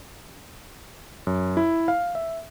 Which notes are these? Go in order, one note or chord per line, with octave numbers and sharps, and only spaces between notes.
F#2
E4
F5
E5